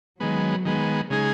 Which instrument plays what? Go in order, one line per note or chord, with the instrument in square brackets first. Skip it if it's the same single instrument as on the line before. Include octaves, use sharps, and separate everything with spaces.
[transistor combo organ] D#3 G#3 B3 [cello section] F#3
[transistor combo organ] D#3 G#3 B3
C#3 G#3 D#4 G#4